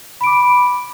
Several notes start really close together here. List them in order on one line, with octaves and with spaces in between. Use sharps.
B5 D7 D6